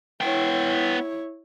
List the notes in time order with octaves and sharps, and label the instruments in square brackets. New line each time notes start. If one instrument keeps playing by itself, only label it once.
[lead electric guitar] B3 G5 [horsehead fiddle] E4 C#5